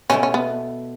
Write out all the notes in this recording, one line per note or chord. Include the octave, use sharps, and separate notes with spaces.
B2 A3 C#4 E4
C#4
B3